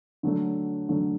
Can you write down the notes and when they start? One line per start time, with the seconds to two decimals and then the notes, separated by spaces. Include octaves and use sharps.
0.23 D3 F#3 A3
0.89 D3 F#3 A3